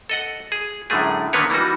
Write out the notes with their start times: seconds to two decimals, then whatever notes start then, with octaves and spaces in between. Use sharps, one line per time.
0.09 A4 D#5 F#5
0.52 G#4
0.90 F#2 A2 D3 G#3 A3 G#4
1.33 D3 D#3 A#3 B3 B4 C#5
1.50 E3 G3 A#3 D#4 F#4